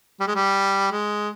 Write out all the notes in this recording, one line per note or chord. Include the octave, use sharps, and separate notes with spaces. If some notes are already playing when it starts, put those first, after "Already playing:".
G3
G#3
G3
G#3